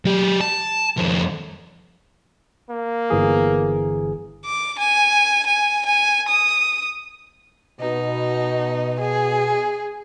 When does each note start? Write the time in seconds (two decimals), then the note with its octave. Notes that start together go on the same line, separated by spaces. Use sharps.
0.05 F#3 G4
0.41 A5
0.97 F2 D#3
2.70 A#3
3.10 G1 E3 G#4
4.45 D6
4.79 G#5
5.46 G#5
5.86 G#5
6.28 D#6
7.81 B2 D#4
9.00 G#4